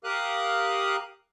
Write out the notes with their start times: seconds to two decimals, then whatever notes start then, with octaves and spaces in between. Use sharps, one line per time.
0.04 G4 A#4 F5 D#6 F#6